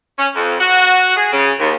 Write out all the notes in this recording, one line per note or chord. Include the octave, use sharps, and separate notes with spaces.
C#4
F2
F#4
G#4
C#3
D#2